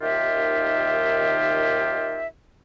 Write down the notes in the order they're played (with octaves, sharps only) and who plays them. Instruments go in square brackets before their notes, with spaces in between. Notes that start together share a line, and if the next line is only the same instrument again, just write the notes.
[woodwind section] D#2 D#3 F4 G4 E5